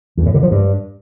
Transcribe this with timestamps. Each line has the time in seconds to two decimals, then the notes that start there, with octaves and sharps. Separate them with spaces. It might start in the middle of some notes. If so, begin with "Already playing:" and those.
0.17 E2
0.26 A2
0.34 D3
0.43 F3
0.51 G2